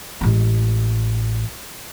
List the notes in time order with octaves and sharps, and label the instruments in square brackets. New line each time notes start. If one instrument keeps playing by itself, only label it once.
[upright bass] A1 G#3